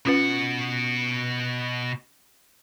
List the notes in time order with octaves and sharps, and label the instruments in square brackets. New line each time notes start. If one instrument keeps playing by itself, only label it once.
[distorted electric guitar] B2 F#5 [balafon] C#4 F4 B4